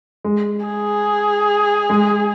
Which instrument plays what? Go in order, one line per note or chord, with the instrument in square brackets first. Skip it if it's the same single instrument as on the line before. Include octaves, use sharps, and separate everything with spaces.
[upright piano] G#3
[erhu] G#4
[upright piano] G#3